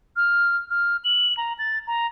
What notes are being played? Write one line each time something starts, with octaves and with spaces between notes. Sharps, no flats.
F6
F6
F#7
A#5
A6
A#5